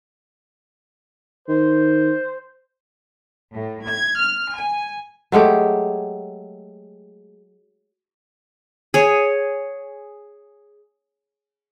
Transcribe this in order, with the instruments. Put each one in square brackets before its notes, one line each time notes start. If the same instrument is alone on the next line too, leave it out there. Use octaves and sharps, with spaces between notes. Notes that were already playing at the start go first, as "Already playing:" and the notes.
[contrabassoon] D#3 [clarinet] C5
[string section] A2
G#6
F6
G#5
[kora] F#3 G#3 A3 G4
[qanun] G#4 C#5